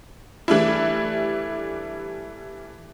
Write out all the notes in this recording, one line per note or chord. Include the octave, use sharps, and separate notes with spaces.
E3 G3 A3 D4 E4